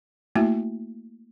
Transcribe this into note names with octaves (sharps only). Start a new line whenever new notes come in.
A3 A#3 E4 F#4 E5